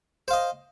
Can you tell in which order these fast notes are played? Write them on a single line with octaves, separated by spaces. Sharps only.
C5 F5 D#5